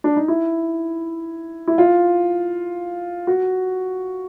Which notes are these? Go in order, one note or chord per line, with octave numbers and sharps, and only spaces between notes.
D4
D#4
E4
E4
F4
F#4